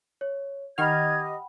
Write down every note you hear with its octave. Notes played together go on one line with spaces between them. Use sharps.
C#5
D#3 G4 D#5 F#5 G5 B5 F6 G#6